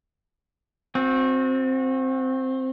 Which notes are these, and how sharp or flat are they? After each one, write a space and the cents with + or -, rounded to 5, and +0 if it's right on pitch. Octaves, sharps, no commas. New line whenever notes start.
C4 +0 F#4 -35